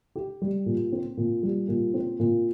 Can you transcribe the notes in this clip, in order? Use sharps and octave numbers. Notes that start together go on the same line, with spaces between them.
G4
G3
A#2
C4
A#2
G3
A#2
C4
A#2